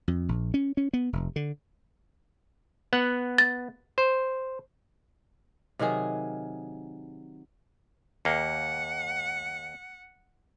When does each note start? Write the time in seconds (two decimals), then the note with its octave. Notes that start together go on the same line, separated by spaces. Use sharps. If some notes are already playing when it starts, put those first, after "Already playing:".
0.08 F2
0.29 A#1
0.54 C#4
0.77 C#4
0.93 B3
1.13 F1
1.36 D3
2.93 B3 F#5
3.38 A6
3.98 C5
5.79 C3 D#3 F#3 G#4
8.25 D#2 A#3 F#5